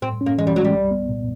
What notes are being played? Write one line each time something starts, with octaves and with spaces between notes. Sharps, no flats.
A2 C4
C#4
A#3
E3 G#3
G3
F#3 G#3
G3
C2
B3
A#2